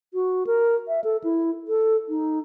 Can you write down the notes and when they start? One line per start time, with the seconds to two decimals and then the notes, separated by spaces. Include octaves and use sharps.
0.14 F#4
0.47 A#4
0.88 E5
1.04 A4
1.24 E4
1.68 A4
2.09 D#4